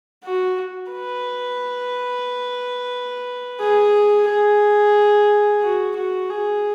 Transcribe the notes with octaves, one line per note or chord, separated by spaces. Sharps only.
F#4
B4
G#4
G#4
F#4
F#4
G#4